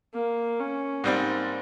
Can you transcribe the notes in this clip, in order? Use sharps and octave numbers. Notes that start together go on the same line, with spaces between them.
A#3
C#4
G#2 G3 A#3 C4